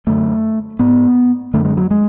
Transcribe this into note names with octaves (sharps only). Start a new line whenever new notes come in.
F#2 D3 A3
G#2 B3
F#2 D3 A3
G#3
F#3
G#3